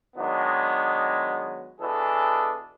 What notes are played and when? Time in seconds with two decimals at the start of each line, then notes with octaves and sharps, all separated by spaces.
0.17 D#3 F#3 G#3 B3 D4
1.81 B2 E3 D4 G#4 A4